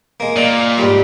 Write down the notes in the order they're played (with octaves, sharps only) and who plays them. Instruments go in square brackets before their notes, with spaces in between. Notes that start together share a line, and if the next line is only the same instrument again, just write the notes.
[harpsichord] G#3 A#3
[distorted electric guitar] A#2 [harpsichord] D5
[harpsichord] G#2 G3